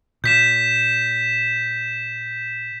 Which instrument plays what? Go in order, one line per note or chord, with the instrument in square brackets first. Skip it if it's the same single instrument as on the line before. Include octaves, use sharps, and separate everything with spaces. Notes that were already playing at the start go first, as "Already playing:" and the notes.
[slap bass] A#2 [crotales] G6 B6 E7